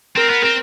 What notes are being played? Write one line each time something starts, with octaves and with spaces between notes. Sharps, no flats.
C4 A#4
B3
C4